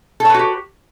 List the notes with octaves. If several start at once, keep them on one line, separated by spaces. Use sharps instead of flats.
F#4 G4 A4 B4 C#5